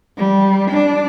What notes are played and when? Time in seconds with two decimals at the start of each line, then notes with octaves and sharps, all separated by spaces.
0.18 G3
0.71 D4